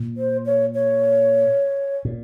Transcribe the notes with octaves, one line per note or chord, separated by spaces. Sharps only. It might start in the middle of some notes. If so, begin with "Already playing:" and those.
Already playing: A#2
C5
C#5
C#5
A#2